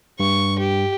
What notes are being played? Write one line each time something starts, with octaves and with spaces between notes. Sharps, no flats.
G2 C#6
G4